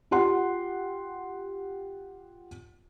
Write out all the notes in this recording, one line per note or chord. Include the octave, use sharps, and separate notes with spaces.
F4 G4 F#5 C6